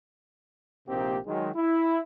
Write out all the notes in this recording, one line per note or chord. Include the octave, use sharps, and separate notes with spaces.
A#1 C3 A#3 C4 D#4 G4
D#3 F#3 G#3
E4